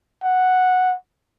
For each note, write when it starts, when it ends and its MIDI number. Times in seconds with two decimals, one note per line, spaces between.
0.23 0.96 78